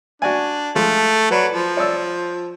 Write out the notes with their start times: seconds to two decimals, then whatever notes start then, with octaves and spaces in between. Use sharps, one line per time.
0.22 D4 F#4 D5 G#5
0.76 F3 G#3 A3
1.31 F#3 B4 D5 B5
1.52 F3
1.77 C#5 D5 E6